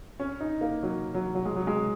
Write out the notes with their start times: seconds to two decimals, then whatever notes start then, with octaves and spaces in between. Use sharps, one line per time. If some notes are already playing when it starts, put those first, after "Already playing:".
0.20 C#4
0.41 D#4
0.61 A#3
0.83 F#3
1.14 F#3
1.35 F#3
1.45 G#3
1.56 F#3
1.67 G#3